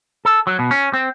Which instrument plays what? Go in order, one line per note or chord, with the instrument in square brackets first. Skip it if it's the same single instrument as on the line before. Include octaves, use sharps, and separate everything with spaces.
[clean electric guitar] A4
F#3
B2
C#4
C4